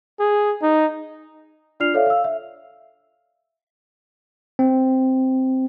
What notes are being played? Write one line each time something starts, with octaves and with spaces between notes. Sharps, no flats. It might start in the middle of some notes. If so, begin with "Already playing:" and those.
G#4
D#4
D4 F4 D5 F6 C7 F7
A4 C#5 D5 E5 F5
F5 E6
E5
C4